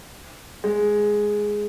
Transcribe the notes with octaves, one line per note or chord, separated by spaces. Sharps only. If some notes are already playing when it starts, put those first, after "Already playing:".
G#3